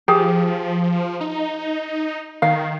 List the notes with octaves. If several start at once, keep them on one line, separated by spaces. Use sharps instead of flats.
F3 G4 G#4
D#4
D#3 F5